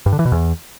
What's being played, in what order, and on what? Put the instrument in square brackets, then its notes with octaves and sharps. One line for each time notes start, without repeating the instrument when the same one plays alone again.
[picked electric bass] G2
D3
E3
B2
E2